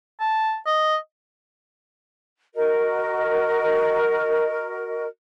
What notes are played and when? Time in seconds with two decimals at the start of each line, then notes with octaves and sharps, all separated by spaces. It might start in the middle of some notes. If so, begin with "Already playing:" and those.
0.20 A5
0.66 D#5
2.55 F#4 A#4 D#5